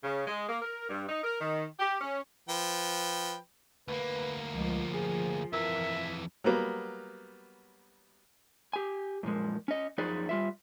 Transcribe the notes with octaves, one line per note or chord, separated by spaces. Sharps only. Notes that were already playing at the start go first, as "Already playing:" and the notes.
C#3
G#3
A#3
A#4
G2
D#4
A#4
D#3
G4
C#4
F3 B4 G5
D2 A#3 B4
C#2 F3
G#4
F2 E3 A#4 E5
F#3 G3 A#3 B3
G4 G#5
F#2 A#2 F3 G#3
C#4 D#5
F#2 F3 D#4 G#4 B4 D5
G3 F4 E5